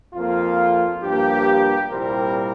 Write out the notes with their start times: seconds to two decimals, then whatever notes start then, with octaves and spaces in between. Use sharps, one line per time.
0.14 F2 F3 A#3 F4
1.02 G2 F3 A#3 G4
1.90 C2 A#2 G3 C4 A#4